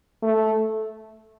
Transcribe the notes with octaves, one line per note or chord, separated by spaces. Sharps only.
A3